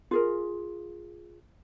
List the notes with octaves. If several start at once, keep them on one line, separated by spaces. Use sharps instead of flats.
F4 G#4 A#4